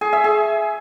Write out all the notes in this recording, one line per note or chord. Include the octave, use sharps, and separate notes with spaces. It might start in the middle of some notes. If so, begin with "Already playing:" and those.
G#4
E5
G#4